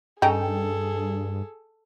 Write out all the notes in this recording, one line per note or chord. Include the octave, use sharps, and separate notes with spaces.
G2 C#3 C#4 D#4 G#4 A4 G5